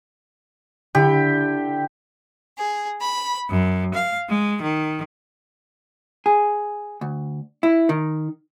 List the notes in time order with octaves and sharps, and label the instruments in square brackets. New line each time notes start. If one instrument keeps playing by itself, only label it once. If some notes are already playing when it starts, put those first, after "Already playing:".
[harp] D3 E4 [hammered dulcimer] G4
[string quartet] G#4
B5
F#2
F5
G#3
D#3
[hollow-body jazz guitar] G#4
D2
E4
D#3